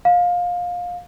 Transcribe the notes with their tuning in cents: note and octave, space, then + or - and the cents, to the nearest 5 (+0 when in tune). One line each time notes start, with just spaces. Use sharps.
F5 +20